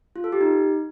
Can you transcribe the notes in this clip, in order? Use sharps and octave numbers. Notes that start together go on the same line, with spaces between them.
F4
A4
G4
D#4